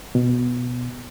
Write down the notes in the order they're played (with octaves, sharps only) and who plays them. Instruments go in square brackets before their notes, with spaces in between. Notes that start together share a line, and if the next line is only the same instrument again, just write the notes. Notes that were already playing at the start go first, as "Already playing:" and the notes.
[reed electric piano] B2